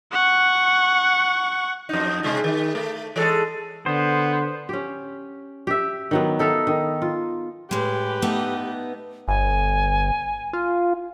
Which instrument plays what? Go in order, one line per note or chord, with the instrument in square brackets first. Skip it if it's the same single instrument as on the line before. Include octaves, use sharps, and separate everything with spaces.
[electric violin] F#5 C#6
[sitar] F2 D#4
C3 G#3 F4
D#3
A3
E3 G#3 A4
[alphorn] D3 [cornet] B3 [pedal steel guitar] C5
[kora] C#4 G4
G4 E5
D#3 F#3 B3
D#4 A4 E5 F5
D#3
F4
[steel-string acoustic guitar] A2 G#3 [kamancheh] G4 B4
[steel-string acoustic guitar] A3 B3 D#4
[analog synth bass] G1 [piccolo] G#5
[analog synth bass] F4